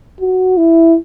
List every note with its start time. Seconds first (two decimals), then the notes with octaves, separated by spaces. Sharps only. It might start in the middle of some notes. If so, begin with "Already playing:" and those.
0.21 F#4
0.57 E4